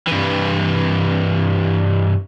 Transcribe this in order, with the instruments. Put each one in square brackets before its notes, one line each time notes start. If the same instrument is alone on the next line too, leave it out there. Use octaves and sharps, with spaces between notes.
[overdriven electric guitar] G2 E3